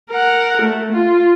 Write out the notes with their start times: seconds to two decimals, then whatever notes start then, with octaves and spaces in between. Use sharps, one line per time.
0.10 A#4 F#5
0.62 A3
0.92 F4